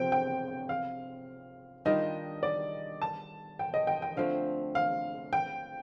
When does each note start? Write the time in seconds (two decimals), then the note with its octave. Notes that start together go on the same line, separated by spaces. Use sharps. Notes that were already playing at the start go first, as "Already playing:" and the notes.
Already playing: C3 F3 C4 G5
0.12 G5
0.69 F5
1.85 D#3 G3 D4 F4 D#5
2.43 D5
3.02 A5
3.59 G5
3.74 D#5
3.87 G5
4.02 G5
4.17 D3 F3 A3 C4 F5
4.75 F5
5.33 G5